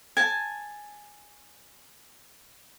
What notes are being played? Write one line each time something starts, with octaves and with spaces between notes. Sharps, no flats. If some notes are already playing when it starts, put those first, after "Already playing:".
G#5 A5